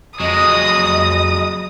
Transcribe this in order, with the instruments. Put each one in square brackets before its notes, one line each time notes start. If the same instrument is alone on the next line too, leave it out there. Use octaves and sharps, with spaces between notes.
[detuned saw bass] F2 [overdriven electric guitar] F#3 G#3 [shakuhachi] D#5 [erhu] D#6